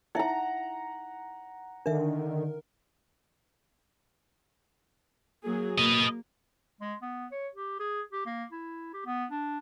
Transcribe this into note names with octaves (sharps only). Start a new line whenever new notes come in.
D#4 E4 E5 F#5 A#5
D3 D#3 D4 A#4 E5
F#3 A#3 G#4
A#3 B4 D#5
G#3
B3
C#5
G4
G#4
G4
A#3
E4
G4
B3
D4